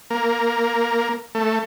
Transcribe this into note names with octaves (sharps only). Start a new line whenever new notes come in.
A#3
A3